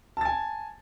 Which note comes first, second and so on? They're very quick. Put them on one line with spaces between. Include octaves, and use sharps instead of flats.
A5 A6 G#5